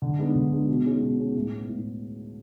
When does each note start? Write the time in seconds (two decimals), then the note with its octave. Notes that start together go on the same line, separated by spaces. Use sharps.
0.02 D3
0.19 G#3 B3 D4
0.35 D3
0.52 G#3 B3 D4
0.68 B2
0.85 G#3 C#4 G#4
1.02 B2
1.18 G#3 C#4 G#4
1.36 A2
1.52 G#3 B3
1.69 A2